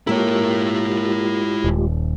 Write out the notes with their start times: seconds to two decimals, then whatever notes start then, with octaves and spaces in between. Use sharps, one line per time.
0.07 G#3 A#3 E4 F4 G4 A#4 C#5
1.64 D#1